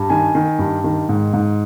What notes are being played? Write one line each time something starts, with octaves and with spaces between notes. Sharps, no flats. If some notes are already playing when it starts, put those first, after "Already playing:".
Already playing: G2
D#3 G#5
D#3
G2
D#3
G#2
G#2